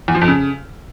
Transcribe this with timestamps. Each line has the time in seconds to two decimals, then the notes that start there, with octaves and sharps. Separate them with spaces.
0.08 E2
0.15 F3
0.21 F2
0.28 C#3